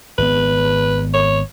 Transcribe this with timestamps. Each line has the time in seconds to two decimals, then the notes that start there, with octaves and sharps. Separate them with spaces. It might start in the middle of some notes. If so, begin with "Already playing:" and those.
0.18 G#1 B3 B4
1.14 C#5